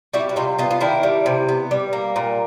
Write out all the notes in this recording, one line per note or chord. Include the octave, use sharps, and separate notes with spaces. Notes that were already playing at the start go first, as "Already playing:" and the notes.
G3 E4 F#4
F#4
C3 D#4 F4
B3 D#4 F4
F4
D#3 D4 E4
G3
C3
B3
G3
A#3
A#2